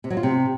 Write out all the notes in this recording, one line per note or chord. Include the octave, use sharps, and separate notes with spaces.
C3
F#3
F4
C3